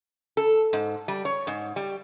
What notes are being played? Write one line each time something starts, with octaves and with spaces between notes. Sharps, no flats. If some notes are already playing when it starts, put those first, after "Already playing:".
A4
G#2
G3
C#5
G#2
G3